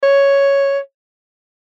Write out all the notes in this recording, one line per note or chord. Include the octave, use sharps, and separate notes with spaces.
C#5